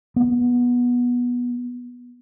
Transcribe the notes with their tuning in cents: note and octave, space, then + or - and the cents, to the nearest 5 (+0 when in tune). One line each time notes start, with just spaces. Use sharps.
B3 -15